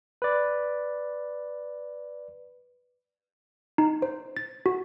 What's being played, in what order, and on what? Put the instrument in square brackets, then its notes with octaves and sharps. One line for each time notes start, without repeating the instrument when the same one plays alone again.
[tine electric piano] B4 D5
[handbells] D#4
C5
A6
F#4